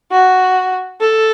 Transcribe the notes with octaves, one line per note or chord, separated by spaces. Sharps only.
F#4
A4